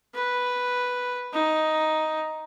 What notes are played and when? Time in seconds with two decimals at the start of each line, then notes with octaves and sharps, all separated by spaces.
0.14 B4
1.33 D#4